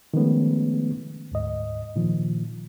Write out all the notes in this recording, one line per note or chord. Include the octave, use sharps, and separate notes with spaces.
D#3 F3 G#3 A3 B3 C#4
D2 G#2 D#5
A#2 D#3 F3